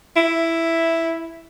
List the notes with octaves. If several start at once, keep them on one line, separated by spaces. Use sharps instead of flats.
E4